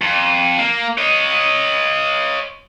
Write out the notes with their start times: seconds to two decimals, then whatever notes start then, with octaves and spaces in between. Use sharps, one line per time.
0.01 F2
0.58 A#3
0.98 C#5 D#5